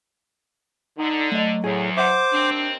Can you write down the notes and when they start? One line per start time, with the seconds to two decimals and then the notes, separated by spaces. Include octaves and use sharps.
0.98 D3 D#4
1.32 F#3 A3 D#5
1.64 E2 A2 G#4
1.97 C5 E5 F#5 D6
2.33 D#2 C4 D4